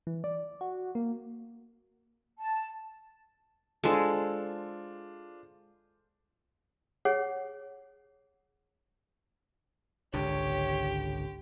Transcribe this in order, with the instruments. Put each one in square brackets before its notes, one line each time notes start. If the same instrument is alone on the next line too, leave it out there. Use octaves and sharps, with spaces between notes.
[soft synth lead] E3
D5
F#4
A#3
[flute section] A5
[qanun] G#3 A4 [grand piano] D4 F4 C5
[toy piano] G#4 C#5 F#5
[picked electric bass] G#1 C#2 D3 [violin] G4 [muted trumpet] C#5